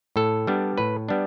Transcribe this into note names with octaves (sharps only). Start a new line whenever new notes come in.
A2 A4
G3 B3 D4
A2 B4
G3 B3 D4